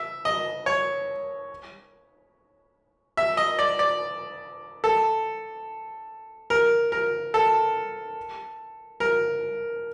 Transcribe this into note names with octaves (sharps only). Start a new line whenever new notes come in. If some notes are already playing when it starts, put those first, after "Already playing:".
Already playing: E5
D#5
C#5
E5
D#5
D5
D5
A4
A#4
A#4
A4
A#4